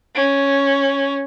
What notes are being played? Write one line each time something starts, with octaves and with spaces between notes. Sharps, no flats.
C#4